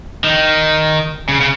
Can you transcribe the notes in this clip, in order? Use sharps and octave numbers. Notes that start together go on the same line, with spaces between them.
D#3
C#3
C#3